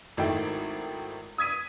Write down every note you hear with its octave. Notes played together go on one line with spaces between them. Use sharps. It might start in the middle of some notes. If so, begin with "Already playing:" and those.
G#1 D#3 A3 E4 G5
D#6 G#6 B6 D#7